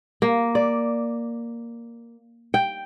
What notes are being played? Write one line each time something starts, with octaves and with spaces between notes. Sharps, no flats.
A#3
D5
G5